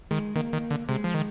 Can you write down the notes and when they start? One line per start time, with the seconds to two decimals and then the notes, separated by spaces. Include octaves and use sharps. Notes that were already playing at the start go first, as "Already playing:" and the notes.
0.11 D#3 G#3
0.36 D#3 A#3
0.53 D#3
0.71 D3
0.89 C3 G#3
1.04 F3
1.14 D#3